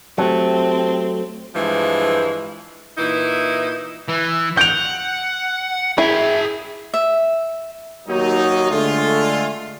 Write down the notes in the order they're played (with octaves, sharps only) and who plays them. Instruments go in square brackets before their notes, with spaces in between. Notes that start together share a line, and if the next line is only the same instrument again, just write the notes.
[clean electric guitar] F#3 A3 [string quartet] C4 [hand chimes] G4 A5
[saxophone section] G2 E3 F3 G#3
A#2 E3 D#4 E4
[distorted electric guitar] E3
[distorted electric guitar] F#5 [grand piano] G6 D7 F7
[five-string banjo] E4 [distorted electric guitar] G#4 G5
[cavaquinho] E5
[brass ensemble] D#2 F#3 D#4
D3 G#3 A3 F4